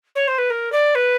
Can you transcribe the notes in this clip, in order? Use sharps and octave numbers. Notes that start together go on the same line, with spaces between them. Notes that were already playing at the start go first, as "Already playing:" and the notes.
C#5
C5
B4
A#4
D5
B4